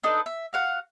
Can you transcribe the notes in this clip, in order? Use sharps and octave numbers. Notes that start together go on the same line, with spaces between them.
D4 D#4 A4 B4
E5
F#4 F5 F#5